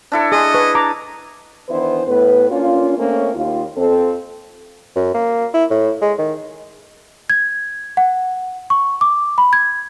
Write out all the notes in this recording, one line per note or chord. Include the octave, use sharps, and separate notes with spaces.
D4 E4 A4
G#4 D#5 C6
B4 C#6
A#5 D6
D#3 E3 B3 D4 E4 C5
A2 B3 B4
A#3 C#4 D4 F4
A3 A#3 C4 C#4
D#2 F4
F2 C4 A4
F#2
A#3
E4
A2
G#3
D#3
G#6
F#5
C#6
D6
B5
G#6